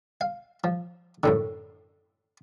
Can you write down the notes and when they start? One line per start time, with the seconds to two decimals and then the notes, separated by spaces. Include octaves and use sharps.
0.21 F5
0.64 F3
1.23 F#2 A2 D3